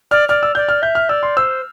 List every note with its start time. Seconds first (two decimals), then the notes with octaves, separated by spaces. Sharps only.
0.11 D5 F6
0.29 D5 F6
0.43 E6
0.55 D5 G6
0.69 F6
0.82 E5 G6
0.95 F6
1.09 D5 E6
1.23 C6
1.37 C5 E6